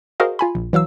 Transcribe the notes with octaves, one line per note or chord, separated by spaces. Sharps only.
F#4 G#4 A#4 C5 D#5 F5
F4 G#5 B5
A#1
E3 F#3 F5 E6